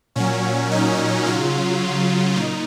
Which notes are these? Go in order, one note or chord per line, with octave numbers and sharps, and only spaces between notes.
A#2 F#3 C#4
D#4
C#3 F#3 F4
A#2 D#4